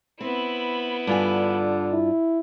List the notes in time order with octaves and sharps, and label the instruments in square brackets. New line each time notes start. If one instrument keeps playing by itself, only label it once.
[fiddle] B3 E4 [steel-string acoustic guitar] C4
[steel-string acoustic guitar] G2 F4 G#5 [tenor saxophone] D3
[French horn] E4